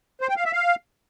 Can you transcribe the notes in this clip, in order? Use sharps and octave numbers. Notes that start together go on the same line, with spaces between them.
C5
G5
F5
E5
F5